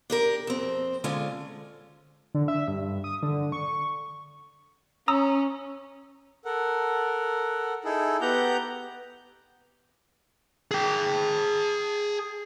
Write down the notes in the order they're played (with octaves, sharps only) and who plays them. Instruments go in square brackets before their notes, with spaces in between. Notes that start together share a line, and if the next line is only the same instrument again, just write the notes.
[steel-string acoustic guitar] D4 G4 A#4
F2 C4
D3 G#3 C#4 F4 G#5
[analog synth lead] D3
E5
G2
D#6
D3
C#6
[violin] C#4 [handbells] A#5 D#6 E6
[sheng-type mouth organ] A4 A#4 F#5
D#4 E4 G#4 A4
B3 G4 F#5 A#5 G6
[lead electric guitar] G#4 G5